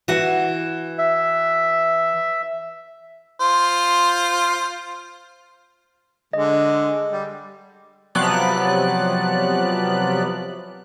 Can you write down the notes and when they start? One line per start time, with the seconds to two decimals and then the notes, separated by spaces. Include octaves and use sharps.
0.08 E3 F#4
0.98 E5
3.40 F4 C5
6.33 D3 G#3 D#5
7.12 G3
8.15 C3 F3 F#3 B3 D5 F#6